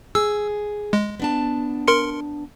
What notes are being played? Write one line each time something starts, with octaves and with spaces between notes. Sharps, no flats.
G#4 E6
G#3
B3 D4 A5
A#4 C6 C#7